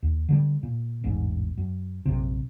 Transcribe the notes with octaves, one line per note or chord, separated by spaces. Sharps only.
D#2
D3 D#3 G3
A#2
E1 A1 G#2
F#2
A#1 F#2 C3